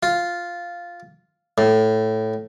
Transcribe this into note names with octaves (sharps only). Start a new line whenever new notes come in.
F4
A2